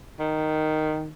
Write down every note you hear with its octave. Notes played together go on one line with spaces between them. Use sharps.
D#3